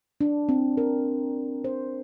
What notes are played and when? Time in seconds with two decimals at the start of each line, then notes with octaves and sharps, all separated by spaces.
0.21 D4
0.49 C4
0.77 A#4
1.64 C5